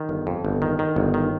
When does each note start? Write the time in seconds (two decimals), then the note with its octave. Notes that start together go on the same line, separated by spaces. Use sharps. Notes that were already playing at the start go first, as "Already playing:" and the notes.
Already playing: D#3
0.09 G1
0.27 F2
0.45 G1
0.62 D#3
0.79 D#3
0.96 G1
1.14 D#3